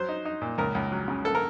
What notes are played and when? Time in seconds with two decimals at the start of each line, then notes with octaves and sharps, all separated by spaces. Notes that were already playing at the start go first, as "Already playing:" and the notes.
Already playing: F#3 C5
0.09 D#4
0.25 D#4
0.42 A#2
0.58 C#2 A#4
0.75 C#2
0.92 F#3
1.08 C#3
1.25 A#3 A4
1.35 A#4